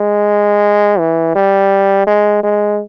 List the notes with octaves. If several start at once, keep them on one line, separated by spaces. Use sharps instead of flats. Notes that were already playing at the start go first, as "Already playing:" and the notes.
Already playing: G#3
E3
G3
G#3
G#3